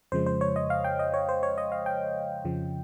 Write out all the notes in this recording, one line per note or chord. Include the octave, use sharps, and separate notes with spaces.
F2 C#3 F3 G#3 C5
C5
C#5
D#5
F5
G5
D#5
C#5
C5
C#5
D#5
F5
G5
F2 C#3 F3